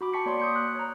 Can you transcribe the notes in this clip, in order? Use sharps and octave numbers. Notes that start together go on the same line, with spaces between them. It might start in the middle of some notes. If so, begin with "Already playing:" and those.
F#4 B5 D6
G5 A5 C#6 B6 C#7
A#3 C#5 D5 C6 D6
D#6 G6 C#7
F#6
C#5 A#5